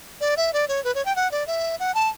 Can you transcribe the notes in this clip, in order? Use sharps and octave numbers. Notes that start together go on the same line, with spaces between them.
D5
E5
D5
C#5
B4
C#5
G5
F#5
D5
E5
F#5
A5